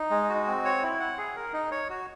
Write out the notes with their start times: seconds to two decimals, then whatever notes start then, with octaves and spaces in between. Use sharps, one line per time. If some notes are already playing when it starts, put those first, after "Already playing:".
Already playing: D#4
0.10 G#3
0.29 F#4
0.47 C4
0.65 C#5
0.83 E4
1.00 F#5
1.18 G#4
1.36 A#4
1.53 D#4
1.71 C#5
1.90 F#4